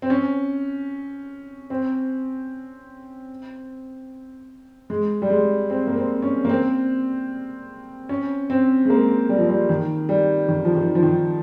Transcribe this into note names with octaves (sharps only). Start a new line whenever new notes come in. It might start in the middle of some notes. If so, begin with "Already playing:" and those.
C4
C#4
C4
G#3
G3
G#3
C4
A#3
C4
C#4
A#3
C4
C#4
C4
G#3
A#3
G3
F3
G3
D#3
G3
D#3
F3
D#3
F3
D#3